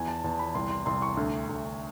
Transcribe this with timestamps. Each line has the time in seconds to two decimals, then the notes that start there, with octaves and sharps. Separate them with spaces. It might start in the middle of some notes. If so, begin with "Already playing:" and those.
Already playing: E2 G#5
0.08 A5
0.24 E2 A5
0.39 B5
0.55 C2 C6
0.71 C6
0.86 C2 C6
1.02 C#6
1.17 D2
1.49 D2